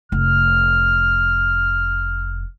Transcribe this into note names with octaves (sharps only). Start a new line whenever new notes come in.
F1 F6